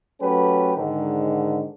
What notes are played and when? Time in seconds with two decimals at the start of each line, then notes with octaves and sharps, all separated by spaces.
0.20 F#3 A3 C#4 G4 A4 B4
0.77 G#2 D3 D#3